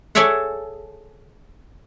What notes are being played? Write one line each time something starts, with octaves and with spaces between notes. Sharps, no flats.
G#4 A4 C#5 D5 E5 F#5